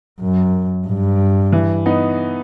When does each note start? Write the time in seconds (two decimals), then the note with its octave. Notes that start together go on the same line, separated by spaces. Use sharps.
0.21 F#2
0.87 G2
1.52 E3
1.86 B3 D#4